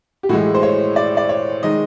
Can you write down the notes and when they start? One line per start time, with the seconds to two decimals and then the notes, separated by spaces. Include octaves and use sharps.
0.23 G4
0.29 A2 E3 G#3 F#4
0.54 C5
0.63 C#5
0.96 D5
1.17 D5
1.29 C#5
1.63 D#3 G#3 D#5